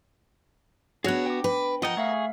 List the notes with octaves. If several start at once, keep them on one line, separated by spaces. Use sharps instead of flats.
B3 D4 F#4 G#4 C#5 F#6 A#6
G5 D6
B4
F3 A#4 D#5 F#5 G5
A3 G#4 E5 F5 C#6